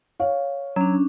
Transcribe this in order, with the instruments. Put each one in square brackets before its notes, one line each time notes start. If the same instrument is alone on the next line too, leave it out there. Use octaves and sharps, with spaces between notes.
[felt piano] C#5 F5
[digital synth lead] F#3 [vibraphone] C#4 D4